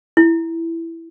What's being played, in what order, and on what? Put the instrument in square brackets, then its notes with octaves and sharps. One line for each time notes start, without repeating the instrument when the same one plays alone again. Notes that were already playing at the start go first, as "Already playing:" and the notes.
[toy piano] E4